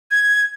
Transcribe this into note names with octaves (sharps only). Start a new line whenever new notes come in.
G#6